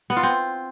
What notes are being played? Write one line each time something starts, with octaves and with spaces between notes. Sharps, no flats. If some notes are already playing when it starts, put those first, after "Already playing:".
B3
F4
C4